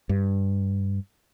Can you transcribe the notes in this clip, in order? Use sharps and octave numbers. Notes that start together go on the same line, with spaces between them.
G2